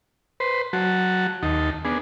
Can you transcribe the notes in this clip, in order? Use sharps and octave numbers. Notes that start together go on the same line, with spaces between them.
B4 C5
F#3 F#4 A5
D#2 D#4 A5
B3 D4 G#4